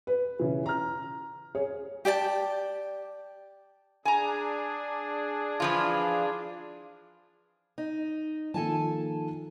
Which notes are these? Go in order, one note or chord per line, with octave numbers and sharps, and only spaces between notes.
B4
C#3 E3
A#5 F6
G#4 C#5
G4 D5 G5 A5
D4 G#4 G#5 A#5
E3 F3 F4
D#4
D#3 F3 A#3 A4 G#5 A5